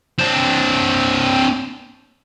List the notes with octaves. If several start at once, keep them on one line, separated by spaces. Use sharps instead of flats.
C4 D4